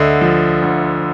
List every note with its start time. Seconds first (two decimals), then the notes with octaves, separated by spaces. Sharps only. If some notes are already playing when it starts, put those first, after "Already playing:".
Already playing: D2 D3 D#5 E5
0.21 F3
0.62 D2